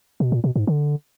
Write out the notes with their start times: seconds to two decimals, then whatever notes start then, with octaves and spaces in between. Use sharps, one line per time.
0.20 B2
0.32 A#2
0.44 B2
0.56 G#2
0.67 D3